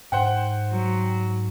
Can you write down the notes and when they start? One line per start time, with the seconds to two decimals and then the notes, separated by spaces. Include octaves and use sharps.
0.12 G#2 C5 F#5 G5
0.74 F#3